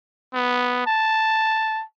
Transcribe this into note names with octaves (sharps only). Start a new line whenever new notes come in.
B3
A5